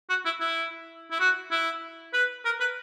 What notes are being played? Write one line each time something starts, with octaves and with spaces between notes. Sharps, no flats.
F#4
E4
E4
E4
F#4
E4
B4
A#4
B4